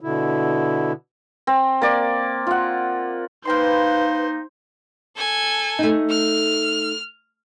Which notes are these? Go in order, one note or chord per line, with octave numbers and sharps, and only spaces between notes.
B2 D3 E4
C4
A#3 D5
F4 F#5
A#3 D#4 B4 C5 G5 C6
A4 G#5
A3 D#4
F6